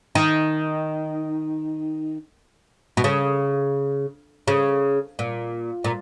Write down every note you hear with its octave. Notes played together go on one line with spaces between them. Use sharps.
D#3
B2
C#3
C#3
A#2
A#2